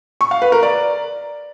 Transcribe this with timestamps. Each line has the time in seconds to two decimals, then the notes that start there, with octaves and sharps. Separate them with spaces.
0.21 C#6
0.31 F5
0.42 B4
0.52 A#4
0.63 D5